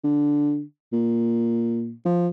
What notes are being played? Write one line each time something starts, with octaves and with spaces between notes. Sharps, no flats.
D3
A#2
F3